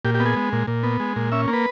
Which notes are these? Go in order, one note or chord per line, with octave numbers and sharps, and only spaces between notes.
A#2 G4
G4
B3
G#4
G#3
A#2
A#2
B3
G#3
A#2
C#4 E5
A#3
B4